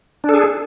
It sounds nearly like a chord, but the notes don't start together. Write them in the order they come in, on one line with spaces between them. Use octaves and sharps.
D4 A4 G#4